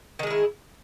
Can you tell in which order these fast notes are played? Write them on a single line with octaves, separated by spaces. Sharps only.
D#3 G#3 G#4 E4